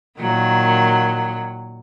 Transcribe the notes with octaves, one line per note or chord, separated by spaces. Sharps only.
A#2 D#3 F#3